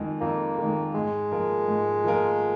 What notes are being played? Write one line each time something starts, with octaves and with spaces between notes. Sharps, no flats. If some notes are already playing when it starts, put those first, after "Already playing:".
Already playing: F2 D#3 G#3
F2 A#3
D#3 G#3
G#2 G#3
F3 A#3 F4 A#4
G#2
F3 A#3 F4 A#4